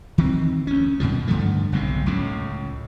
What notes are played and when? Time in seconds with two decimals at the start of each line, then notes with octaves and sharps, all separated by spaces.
0.18 D#3 E3 C4
0.67 D2 C#4
1.00 F#2 B2 D#3 F3
1.28 G2 D3 F3 A3
1.72 F#1 B1 G#2 C3
2.06 C#2 A2 C#3